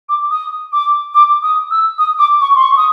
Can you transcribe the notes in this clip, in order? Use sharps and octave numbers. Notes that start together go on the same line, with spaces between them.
D6
D#6
D6
D6
D#6
E6
D#6
D6
C#6
C6
C#6
D#6